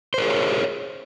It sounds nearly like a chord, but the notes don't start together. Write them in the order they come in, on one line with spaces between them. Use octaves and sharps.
C5 A#4 G#4 C#5